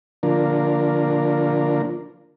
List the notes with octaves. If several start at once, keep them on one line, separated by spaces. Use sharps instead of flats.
D3 F3 A#3 D4 F4 A#4